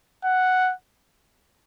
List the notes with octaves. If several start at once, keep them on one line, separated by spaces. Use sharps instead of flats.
F#5